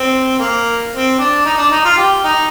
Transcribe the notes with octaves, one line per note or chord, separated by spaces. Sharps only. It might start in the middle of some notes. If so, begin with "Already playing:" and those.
Already playing: C4
A#3
C4
D4
D#4
D4
D#4
F4
G4
D#4